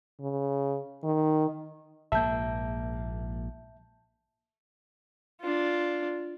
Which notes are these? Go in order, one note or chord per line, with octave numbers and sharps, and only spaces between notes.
C#3
D#3
A#1 G#2 A#3 E5 A5 G6
D4 F4